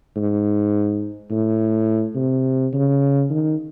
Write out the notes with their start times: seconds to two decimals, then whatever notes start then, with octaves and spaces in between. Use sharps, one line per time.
0.16 G#2
1.31 A2
2.16 C3
2.73 C#3
3.30 D#3